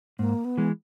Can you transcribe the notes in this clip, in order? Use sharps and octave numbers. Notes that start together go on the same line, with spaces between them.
G#2 A#3
B3
E3 G#3